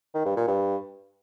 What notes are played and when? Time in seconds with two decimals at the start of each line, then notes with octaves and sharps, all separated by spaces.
0.14 D#3
0.25 G2
0.36 A#2
0.47 G2